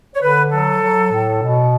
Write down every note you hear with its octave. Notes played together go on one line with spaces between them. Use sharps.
C#5
D3 B4
F#3 A4
F#3
A2
B2